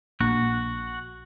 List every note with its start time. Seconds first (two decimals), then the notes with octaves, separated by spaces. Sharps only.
0.21 A#1 A#3 D4 F#4 F#6